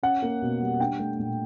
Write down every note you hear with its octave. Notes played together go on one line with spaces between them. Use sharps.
C#4 F#5
A#3
B2
G3
D4 G5
A3
A#2